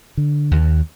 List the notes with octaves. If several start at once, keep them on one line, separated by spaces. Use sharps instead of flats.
D3
D#2